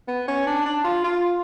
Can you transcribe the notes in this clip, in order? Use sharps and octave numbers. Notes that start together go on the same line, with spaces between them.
B3
C#4
D4
D4
F4
F4